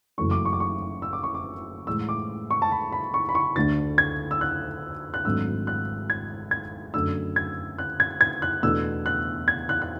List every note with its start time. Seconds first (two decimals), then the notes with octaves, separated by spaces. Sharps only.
0.18 F#1 F#2 E3 A3 C#4 C#6
0.31 D6
0.45 C#6
0.53 D6
0.60 C#6
1.02 E6
1.13 D6
1.23 C#6
1.34 D6
1.87 A2 E3 G#3 E6
2.09 D6
2.51 C#6
2.62 A5
2.72 B5
2.92 B5
3.14 C#6
3.29 B5
3.35 C#6
3.56 D2 D3 A3 D4 A6
3.98 G#6
4.31 E6
4.41 F#6
5.14 F#6
5.25 G#1 G#2 F#3 A3 D4 E6
5.67 F#6
6.10 G#6
6.51 G#6
6.94 F#2 D3 A3 D4 E6
7.36 G#6
7.78 F#6
8.00 G#6
8.21 G#6
8.42 F#6
8.63 E2 B2 A3 D4 E6
9.06 F#6
9.48 G#6
9.69 F#6
9.82 F#6